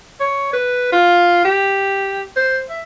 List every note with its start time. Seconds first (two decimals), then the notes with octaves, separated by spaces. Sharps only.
0.20 C#5
0.53 B4
0.92 F4
1.45 G4
2.36 C5
2.70 E5